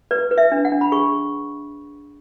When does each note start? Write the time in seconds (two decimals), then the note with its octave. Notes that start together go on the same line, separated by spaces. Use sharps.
0.11 B4 D5
0.31 B4
0.38 E5
0.52 D4
0.65 F#5
0.72 D4
0.81 B5
0.92 G#4 C#6